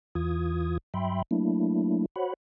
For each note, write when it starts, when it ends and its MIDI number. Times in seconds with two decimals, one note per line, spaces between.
0.15 0.78 40
0.15 0.78 52
0.15 0.78 65
0.15 0.78 87
0.15 0.78 92
0.94 1.22 43
0.94 1.22 54
0.94 1.22 76
0.94 1.22 79
0.94 1.22 83
0.94 1.22 84
1.31 2.06 54
1.31 2.06 57
1.31 2.06 58
1.31 2.06 62
1.31 2.06 64
2.16 2.34 66
2.16 2.34 72
2.16 2.34 73
2.16 2.34 78
2.16 2.34 83